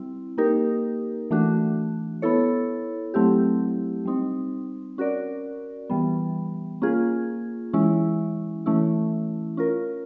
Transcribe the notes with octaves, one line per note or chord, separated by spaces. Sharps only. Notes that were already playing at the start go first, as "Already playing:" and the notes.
Already playing: G3 C4 E4
A#3 D#4 G4 A#4
E3 A3 D4 F#4
B3 E4 A4 C#5
F#3 A3 C4 E4 G4
G3 C4 D#4
C#4 F#4 A#4 D5
E3 G3 B3
A#3 C#4 F4 G#4
E3 G#3 C#4 E4
E3 A3 C#4 E4
C#4 F4 A#4